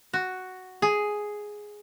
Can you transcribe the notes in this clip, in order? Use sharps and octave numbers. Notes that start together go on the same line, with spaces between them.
F#4
G#4